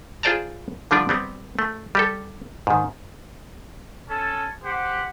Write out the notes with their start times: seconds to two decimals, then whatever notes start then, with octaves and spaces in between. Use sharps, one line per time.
0.23 F4 G#4 C5 D5 A5 A#5
0.91 D3 F3 G3 D4 F4 D5
1.09 G3 B3 C4
1.59 A3
1.95 G3 G4 A4
2.67 G#2 D#3
4.08 C#4 A4
4.63 G4 C5 F#5